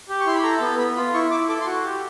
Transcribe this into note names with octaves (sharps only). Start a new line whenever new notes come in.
G4
C#6
E4 C6
B5
A4 A#5
B3
B3 B5
F4 B5
E4 C#6
E4 D6
A4 D6
C6
F#4 C#6
G4